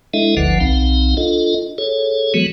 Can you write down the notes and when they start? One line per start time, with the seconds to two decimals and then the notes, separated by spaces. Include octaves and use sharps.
0.14 G#3 D4 E4 A4 D#5 E5
0.37 G1 D2 D3 F3 B4 F#5
0.60 B1 C4 D#4 F5
1.17 D4 F4 A4 D#5
1.78 G#4 A4 C#5
2.34 E3 F#3 G#3 B3 F#4